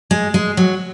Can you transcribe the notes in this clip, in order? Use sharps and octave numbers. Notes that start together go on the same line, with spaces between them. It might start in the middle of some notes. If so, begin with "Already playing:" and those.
G#3
G#3
F#3